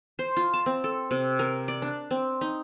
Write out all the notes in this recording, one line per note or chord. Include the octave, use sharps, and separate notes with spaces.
C5
F4
A5
C4
A4
C3
A#4
D5
D4
C4
D#4